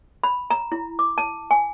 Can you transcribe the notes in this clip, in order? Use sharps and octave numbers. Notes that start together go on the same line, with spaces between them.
B5
A#5
E4
D6
A5
G#5